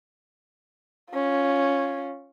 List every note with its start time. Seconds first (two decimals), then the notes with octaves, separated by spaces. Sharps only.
1.13 C#4 F4